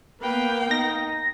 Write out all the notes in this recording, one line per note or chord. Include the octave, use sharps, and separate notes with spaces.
A#3 B3 B4 F5 G5
D#4 A#6